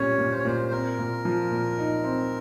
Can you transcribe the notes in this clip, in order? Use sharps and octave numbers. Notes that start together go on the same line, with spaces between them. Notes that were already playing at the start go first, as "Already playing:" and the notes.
Already playing: A#2 G3 C#4 C#5
A#2
C5
C#5
A#2 C5
C4 A#4
A#2
F3
A#2
D#4
C4